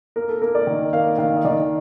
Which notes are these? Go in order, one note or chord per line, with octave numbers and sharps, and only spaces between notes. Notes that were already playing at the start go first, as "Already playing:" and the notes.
A#3 A#4
A4
A#3 A#4
D5
D#3
A#3 F5
D#3 F5
D#5
D#3 D5